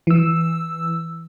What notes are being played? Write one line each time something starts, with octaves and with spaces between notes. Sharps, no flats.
E3 E6